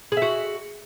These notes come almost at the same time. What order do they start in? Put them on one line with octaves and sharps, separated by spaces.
G#4 E5 F#4